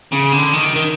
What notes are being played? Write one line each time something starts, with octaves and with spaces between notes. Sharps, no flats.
C#3
D3
D#3
D#3